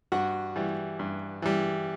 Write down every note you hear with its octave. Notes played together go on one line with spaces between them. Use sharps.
G2 F#4 F#5
E3 G3
G2
E3 G3